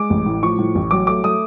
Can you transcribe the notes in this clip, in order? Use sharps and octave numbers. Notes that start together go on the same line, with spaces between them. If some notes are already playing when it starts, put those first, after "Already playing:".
Already playing: G#3 D6
A1
A2
F3 C#6
A2
A1
F#3 D6
A3 D6
A3 D#6